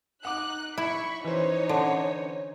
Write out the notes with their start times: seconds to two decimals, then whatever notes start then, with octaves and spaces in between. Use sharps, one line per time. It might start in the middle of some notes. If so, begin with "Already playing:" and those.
0.25 D#4 F#5 D6 F#6
0.78 E4 B5 C#6
1.24 E3 C#4 D#4 C5 C#5
1.69 D3